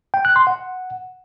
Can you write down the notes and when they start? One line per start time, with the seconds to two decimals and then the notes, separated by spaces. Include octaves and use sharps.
0.14 G5
0.25 F#6
0.36 C6
0.47 F#5